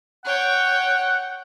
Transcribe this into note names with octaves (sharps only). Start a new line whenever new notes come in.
C#5 F#5 G5